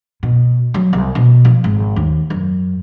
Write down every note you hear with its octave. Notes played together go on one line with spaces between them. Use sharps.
B2
F#3
C2
B2
F3
G#1
D#2
F#2